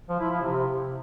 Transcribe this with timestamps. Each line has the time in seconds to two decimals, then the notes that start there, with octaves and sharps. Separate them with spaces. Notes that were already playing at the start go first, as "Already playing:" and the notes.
0.09 F3
0.20 E4
0.31 F3
0.41 C3